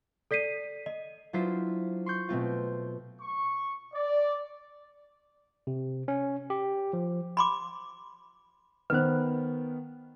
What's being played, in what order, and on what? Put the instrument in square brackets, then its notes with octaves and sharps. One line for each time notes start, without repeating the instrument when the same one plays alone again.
[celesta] A4 D5 B6 C7 D#7
D#5
[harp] F#3 D4 E4 F4 C5 B6
C6 C#6 G6
B2 A3 C4 F4
[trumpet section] C#6
D5
[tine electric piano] C3
C#4
G4
F3
[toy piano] B5 C6 D6
[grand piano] D#3 B3 [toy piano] B4 C5